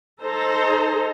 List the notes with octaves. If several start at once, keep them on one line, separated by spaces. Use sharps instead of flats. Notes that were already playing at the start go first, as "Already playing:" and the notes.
D#4 A4 C5 A#5